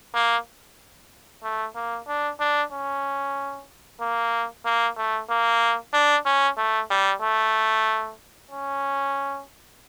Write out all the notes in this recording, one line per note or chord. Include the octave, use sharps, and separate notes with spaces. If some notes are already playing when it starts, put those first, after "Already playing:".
A#3
A3
A#3
D4
D4
C#4
A#3
A#3
A3
A#3
D4
C#4
A3
G3
A3
C#4